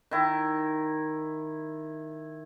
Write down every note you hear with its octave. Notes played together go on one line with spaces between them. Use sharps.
D#3 E4